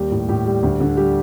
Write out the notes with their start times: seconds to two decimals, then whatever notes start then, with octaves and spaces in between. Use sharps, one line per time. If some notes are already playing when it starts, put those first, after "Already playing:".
Already playing: D#2 G3 G4
0.11 A2
0.28 A2 G4
0.46 G3
0.63 D2
0.80 D3
0.97 G3 G4